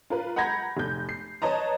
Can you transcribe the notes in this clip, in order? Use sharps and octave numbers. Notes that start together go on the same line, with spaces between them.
F4 A#4 B4
F#5 A#5 B5 G6 G#6 A#6
F1 G6
C7
B4 C#5 D#5 A5 A#5